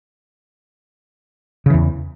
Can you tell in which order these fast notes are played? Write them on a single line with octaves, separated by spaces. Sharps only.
C#3 E3 E2